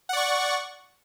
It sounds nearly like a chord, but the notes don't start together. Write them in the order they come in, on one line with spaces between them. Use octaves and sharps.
F#5 D5 C#6